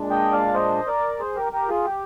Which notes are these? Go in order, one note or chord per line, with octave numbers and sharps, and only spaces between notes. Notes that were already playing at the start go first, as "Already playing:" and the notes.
Already playing: A#2 G#3 D4
D#5 G5
D5 F5
C5 D#5
A#4 D5
G#4 C5
G4 A#4
G4 A#4
F4 G#4
G4